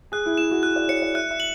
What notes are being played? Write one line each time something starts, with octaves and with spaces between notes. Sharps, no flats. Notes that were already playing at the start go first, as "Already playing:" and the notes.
G#4 F#6
E4
E4 E7
F#4
G#4 F#6
D5
C#5 C#7
D5
E5 F#6
E5
F#7